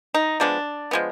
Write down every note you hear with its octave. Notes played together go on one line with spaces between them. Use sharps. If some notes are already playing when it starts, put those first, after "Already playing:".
D#4
F3 G#3 B3 D4
F3 G#3 B3